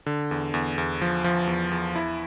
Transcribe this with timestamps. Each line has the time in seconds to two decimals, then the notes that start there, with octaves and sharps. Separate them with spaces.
0.06 D3
0.31 E2
0.54 E2
0.78 E2
1.01 F3
1.24 F3
1.47 E2
1.71 E2
1.95 E4